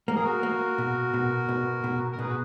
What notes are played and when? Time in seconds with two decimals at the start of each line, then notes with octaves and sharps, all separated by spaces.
0.08 A#3 A#4
0.16 G#4
0.23 F#4 A#4
0.43 A#3
0.78 B2
1.14 B2
1.49 B2
1.84 B2
2.12 A#4
2.19 B2 G#4 B4
2.29 F#4